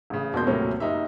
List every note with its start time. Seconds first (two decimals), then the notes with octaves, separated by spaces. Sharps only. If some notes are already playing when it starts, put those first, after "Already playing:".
0.10 A1 C#3
0.33 E1 B2 A#3 D5 C6 G6
0.47 D#1 A2 C3 F#3 A#3 C#4
0.80 F#1 D#4 G4 E5